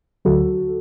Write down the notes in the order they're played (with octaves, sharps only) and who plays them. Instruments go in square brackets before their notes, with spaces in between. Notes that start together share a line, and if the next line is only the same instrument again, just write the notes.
[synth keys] D2 D3 F#3 F#4 A4